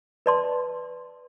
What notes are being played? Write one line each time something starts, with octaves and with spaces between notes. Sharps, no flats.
B4 D5 A5 C6